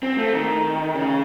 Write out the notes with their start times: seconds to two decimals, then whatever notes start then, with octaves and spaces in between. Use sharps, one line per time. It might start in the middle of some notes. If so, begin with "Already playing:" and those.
0.03 C4
0.18 A3
0.33 D#3
0.95 C#3